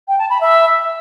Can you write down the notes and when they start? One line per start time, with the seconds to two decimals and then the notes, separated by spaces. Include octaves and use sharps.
0.08 G5
0.19 A5
0.30 B5
0.41 E5